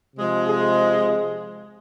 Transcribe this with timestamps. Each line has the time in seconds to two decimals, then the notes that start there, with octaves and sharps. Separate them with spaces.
0.16 C3 F3 G#3
0.47 G#4